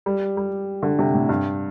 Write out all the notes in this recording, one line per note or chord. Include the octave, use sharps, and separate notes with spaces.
G3
G3
D3
C3
A2
G2